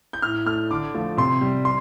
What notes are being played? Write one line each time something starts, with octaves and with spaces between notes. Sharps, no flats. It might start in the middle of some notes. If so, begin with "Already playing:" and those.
G6
A2 F6
A3 F6
D3 D6
F3 A3
C3 C6
G3
C6